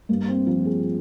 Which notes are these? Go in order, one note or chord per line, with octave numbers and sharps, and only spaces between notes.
G2 A#3
C4
F3 F4
G#4